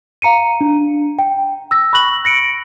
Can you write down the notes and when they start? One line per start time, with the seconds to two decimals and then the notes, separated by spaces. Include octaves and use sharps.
0.22 F5 A#5 C#7 D#7
0.61 D4
1.19 G5
1.71 E6 A#6
1.93 B5 C#6 F#6 A#6 F#7
2.25 A#6 C#7 D7